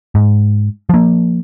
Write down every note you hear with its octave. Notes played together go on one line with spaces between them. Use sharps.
G#2
F3 A#3